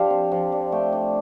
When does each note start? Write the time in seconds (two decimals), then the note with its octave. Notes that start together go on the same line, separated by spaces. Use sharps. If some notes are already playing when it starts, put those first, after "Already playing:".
Already playing: F3 D4 G4 A4 C5 F5
0.10 C4
0.32 F3
0.52 D4
0.72 A3 G5
0.92 D4